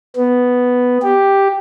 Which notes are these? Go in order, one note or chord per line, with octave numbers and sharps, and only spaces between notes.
B3
G4